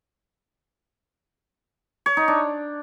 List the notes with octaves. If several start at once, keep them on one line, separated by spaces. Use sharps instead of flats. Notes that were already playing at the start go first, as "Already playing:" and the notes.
C#5
D#4
D4